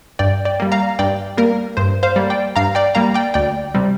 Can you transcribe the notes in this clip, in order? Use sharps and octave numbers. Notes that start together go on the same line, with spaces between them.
G2 D5 G5
D5 G5
G3 A#3
F5 A#5
G2 D5 G5
G3 A#3 A#4
G2 C5
C5 F5
G3 A#3
D5 G5
G2 F5 A#5
D5 G5
G3 A#3 F5 A#5
D5 G5
D2 D5 G5
C3 G3 C4